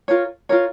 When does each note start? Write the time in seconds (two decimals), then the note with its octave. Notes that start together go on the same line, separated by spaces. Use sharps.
0.08 F4 A#4 C#5
0.49 F4 A#4 C#5